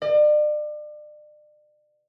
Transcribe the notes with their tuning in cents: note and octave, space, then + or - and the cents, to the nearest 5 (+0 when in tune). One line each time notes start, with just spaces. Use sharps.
D5 +40